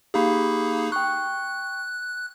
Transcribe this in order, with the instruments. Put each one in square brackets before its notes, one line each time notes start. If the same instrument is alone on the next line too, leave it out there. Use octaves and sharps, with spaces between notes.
[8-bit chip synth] A#3 D#4 G#4 [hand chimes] G4 F5 B5
[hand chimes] G5 C#6 [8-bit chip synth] F#6